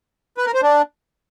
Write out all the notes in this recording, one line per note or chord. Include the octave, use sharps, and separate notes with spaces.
B4
A#4
C5
D4